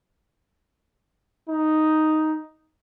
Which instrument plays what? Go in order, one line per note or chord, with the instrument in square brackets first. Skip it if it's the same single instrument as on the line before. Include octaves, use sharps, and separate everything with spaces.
[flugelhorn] D#4